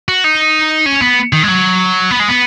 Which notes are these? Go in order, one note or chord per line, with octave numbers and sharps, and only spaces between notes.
F#4
D#4
C#4
B3
D#3
G#3
F#3
B3
G#3
B3